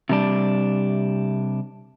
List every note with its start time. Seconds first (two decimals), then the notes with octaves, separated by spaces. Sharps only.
0.09 C3 G3 D4